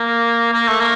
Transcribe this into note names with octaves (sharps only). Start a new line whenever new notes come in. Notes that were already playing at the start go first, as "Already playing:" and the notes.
Already playing: A#3
A#3
A3
A#3